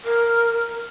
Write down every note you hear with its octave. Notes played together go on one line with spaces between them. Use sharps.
A#4